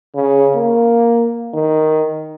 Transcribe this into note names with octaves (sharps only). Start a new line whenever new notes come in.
C#3
A#3
D#3